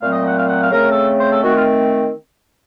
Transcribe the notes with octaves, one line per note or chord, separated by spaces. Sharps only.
A#2 F#3 A3 C4 F5
D#5
F#5
F5
F#5
F5
C#3 A3 C4 A#4
A4
C5
A4
D#3 A3 C4 F#4
F4